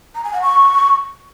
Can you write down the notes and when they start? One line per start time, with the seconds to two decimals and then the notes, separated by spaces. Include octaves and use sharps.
0.15 A#5
0.24 G#5
0.33 F#5
0.42 C#6